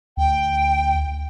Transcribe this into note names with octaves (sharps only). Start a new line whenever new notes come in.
D2 G5